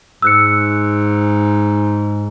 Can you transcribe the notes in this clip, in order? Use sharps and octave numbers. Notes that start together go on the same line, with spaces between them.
G#2 E6 F#6 C#7